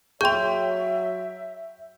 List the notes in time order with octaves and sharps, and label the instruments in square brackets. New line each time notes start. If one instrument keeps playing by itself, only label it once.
[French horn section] F#3 C#5 [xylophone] G#4 C6 [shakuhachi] E5 [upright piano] G5 G6